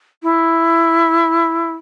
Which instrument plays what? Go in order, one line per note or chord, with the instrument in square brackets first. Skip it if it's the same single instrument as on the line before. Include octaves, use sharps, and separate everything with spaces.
[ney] E4